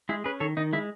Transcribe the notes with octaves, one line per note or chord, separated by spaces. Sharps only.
G#3 E4 G#4
C#4 G#4 B4
D#3 A4 C#5
D#3 D#4
G#3 E4